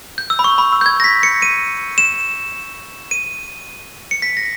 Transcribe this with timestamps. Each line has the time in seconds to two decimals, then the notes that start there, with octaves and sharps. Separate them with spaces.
0.18 G6
0.30 E6
0.39 B5
0.44 C#6
0.58 B5
0.73 E6
0.81 G6
0.86 G#6
1.00 A#6
1.04 B6
1.23 C#7
1.42 D#7
1.98 E7
3.11 D#7
4.11 C#7
4.22 B6
4.37 A#6